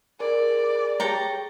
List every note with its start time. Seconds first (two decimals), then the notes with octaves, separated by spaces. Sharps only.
0.20 G#4 A#4 D5
1.00 G4 A4 C#5 G5 A#5